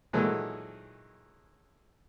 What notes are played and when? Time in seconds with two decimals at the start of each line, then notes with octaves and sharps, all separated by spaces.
0.13 A#2 D#3 E3 F#3 G#3 A3